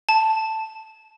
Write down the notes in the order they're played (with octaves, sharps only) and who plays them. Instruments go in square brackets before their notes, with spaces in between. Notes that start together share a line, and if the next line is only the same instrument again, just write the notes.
[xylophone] A5